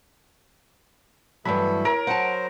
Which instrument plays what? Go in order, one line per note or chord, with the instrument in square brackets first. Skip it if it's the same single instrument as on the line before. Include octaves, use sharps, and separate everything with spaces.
[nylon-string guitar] G2 E3 F#3 [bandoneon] A3 A4 [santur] B5
[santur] A#4 [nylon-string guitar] C#5
[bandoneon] F#3 C5 [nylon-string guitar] F#5 A5